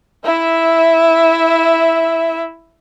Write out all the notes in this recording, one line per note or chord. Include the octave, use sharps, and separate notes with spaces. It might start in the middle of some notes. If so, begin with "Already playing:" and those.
E4 E5